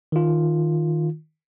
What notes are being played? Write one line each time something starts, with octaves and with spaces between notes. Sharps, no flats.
D#3 F4